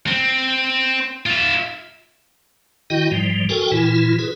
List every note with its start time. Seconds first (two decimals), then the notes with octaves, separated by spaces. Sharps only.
0.07 C4
1.26 F4 E5
2.90 D#3 E4 F#4 D#5 G5
3.11 G#2 F3 G3
3.49 F#4 A4 A#4 G5 G#5
3.72 A#2 E3 E4 F4
4.19 F4 G#4 B4